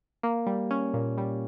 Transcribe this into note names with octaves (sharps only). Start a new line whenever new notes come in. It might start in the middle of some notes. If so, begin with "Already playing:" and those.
A#3
G3
C#4
A#2
G3